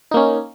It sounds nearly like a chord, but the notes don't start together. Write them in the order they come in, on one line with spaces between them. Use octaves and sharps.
D#4 A#3 C#4